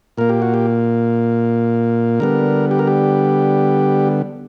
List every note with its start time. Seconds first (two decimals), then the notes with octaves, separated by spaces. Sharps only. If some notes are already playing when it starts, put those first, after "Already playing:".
0.17 A#2 A#3 A#4
0.29 G4
0.42 F#4
0.54 G4
2.20 D3 G3 B3 A#4
2.71 G4
2.79 A#4
2.87 G4